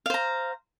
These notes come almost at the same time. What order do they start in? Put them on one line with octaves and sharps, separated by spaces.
F5 C5 A#5